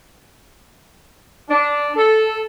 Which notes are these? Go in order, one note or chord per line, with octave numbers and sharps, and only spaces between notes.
D4
A4